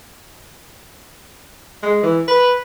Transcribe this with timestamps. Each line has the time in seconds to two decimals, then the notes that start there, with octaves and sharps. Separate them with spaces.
1.82 G#3
2.03 E3
2.28 B4